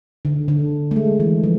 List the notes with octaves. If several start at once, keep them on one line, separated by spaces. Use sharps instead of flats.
D3
D3
A3
G#3
E3
F3